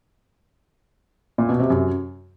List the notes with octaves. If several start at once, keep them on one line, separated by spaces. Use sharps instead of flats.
A#2
B2
C3
F#2